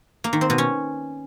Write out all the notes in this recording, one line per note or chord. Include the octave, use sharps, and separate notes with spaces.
A#3
D#3
C4
B2
C#4